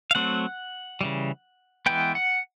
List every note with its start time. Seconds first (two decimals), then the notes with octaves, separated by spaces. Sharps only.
0.11 F5
0.15 F#3 A3 C4 F#5
1.01 C#3 E3 G3
1.86 E3 G#3 B3 G5
2.15 F#5